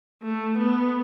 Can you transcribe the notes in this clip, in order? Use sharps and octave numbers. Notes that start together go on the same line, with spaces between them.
A3
B3